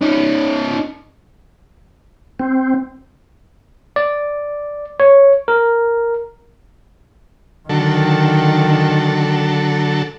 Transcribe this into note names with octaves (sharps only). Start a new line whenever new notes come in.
C#4 D#4
C4
D5
C#5
A#4
D3 D#3 F#3 A4